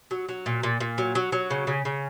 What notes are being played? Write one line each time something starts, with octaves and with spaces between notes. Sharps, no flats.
F#3
F#3
A#2
A#2
A#2
F#3
F#3
F#3
C#3
C#3
C#3